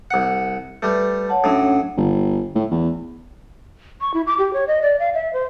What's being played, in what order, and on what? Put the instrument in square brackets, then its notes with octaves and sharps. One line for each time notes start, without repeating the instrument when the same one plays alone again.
[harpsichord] C2 F#5
[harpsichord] G3 A3 [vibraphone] B4
[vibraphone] C#5 F#5 A5
[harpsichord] A2 F#3 [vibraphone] C#4 D4 F#5
[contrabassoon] G1
A2
E2
[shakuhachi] C#6
E4
D6
G4
C#5
D#5
D5
F5
E5
C5